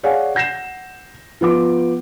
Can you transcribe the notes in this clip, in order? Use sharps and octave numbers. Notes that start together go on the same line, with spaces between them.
G#4 C#5 D5 F5 F#5 G#5
F#5 G6 A#6 C7 E7
F3 B3 F4 D6